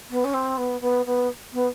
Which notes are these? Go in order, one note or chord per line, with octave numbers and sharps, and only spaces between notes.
B3
C#4
C4
B3
B3
B3
B3